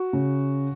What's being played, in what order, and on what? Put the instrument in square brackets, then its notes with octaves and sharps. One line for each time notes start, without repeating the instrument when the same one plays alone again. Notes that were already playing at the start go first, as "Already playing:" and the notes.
Already playing: [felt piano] F#4
C#3